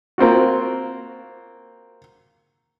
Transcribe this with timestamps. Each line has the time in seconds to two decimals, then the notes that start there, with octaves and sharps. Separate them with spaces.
0.18 A#3 C4 F4 F#4